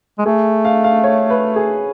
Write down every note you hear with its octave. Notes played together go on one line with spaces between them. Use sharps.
G#3
A3 G#4
F5
F5
C#5
B4
G#4